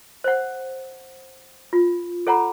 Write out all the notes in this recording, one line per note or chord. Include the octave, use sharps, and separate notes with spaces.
C5 F#5
F4
A4 C#5 F#5 A#5 B5